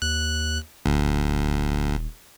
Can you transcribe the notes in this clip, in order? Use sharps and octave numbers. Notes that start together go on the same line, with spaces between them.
D#2 F#6
D#1 D2